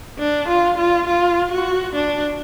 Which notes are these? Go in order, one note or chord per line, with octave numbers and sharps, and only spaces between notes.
D4
F4
F4
F4
F#4
D4